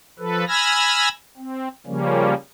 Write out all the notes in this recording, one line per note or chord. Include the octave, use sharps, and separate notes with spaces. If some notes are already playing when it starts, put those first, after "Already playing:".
F3 A4 B4
G#5 B5 E6 F6 G#6 A#6
C4
C#3 F3 G3 A#3 C#4